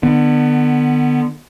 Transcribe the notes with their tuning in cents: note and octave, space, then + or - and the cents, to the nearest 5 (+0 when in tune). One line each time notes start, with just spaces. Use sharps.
D3 +30 B3 +0